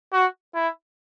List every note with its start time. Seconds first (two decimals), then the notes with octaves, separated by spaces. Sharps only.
0.13 F#4
0.55 E4